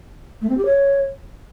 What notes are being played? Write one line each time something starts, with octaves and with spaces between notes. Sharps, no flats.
A3
C4
G4
C#5